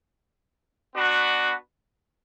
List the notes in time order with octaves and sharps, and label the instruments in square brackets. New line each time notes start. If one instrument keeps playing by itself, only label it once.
[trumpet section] B3 D4 F#4 B4